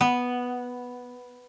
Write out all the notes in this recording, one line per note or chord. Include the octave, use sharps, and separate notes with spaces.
B3